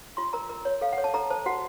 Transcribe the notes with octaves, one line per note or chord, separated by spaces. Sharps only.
F4 C6
A#4 A#5
A#4
C#5
A4 F5
F#5
C#5
A5
A4 A#5
C5 A5
F#4 F#5